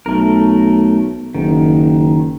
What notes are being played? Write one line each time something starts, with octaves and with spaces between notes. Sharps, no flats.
B1 A3 A#4
F#1 D#3